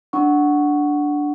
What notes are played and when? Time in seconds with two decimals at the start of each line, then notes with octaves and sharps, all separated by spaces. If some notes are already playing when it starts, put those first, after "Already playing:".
0.13 D4 F#5 C#6